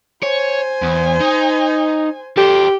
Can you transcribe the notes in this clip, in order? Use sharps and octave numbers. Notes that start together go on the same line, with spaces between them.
C5 C#5 G#5
E2
D#4
G4 A4 C5